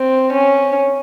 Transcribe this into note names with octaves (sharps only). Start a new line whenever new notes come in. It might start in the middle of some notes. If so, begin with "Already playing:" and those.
Already playing: C4
C#4